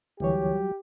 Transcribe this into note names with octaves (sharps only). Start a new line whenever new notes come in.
D2 E3 F#3 G3 G4 C#5